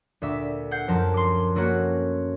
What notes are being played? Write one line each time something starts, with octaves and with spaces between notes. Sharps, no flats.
D2 A#2 E5 D6
F#5 G6 C7
F#2 F3 A#4 A5
C6 D6
A3 A#3 C#4 F#4 C#5